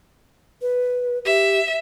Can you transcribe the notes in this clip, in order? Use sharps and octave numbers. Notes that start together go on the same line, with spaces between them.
B4
G4 E5